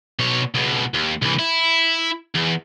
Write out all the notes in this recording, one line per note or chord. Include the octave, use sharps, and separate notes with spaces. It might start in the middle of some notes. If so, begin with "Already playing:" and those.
B2 C#5
C#2 B2
D#2
C2 E3
E4
E2